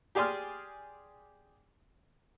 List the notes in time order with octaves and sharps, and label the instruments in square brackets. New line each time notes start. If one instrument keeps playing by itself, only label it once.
[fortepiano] G4 G#4 D5 G#5 C6 F6